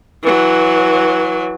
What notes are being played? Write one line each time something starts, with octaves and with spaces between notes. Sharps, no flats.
E3 F#3